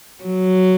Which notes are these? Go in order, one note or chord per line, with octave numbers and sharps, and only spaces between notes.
F#3